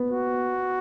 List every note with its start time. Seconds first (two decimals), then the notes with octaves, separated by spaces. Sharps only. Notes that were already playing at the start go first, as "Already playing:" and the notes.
Already playing: B3
0.10 F#4